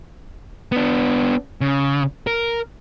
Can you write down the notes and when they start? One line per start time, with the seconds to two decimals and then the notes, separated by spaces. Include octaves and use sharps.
0.72 B3 D4
1.61 C#3
2.27 A#4